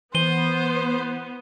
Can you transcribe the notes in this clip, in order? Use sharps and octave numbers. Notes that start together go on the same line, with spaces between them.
E3 B3 C5 D#7 G7